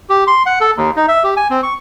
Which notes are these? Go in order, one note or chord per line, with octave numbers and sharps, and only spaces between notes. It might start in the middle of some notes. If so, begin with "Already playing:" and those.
G4
C6
F#5
A4
D#2
D#4
E5
G4
G#5
C4
C#6